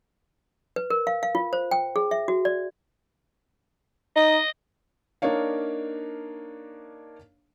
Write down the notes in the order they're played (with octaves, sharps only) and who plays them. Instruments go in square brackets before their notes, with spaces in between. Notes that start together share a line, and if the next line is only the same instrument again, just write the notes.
[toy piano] B4
A#4
F5
F5
F4
C5
G5
G#4
E5
F#4
D5
[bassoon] D#4 [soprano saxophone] D#5
[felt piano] A#3 D4 D#4 C#5 F5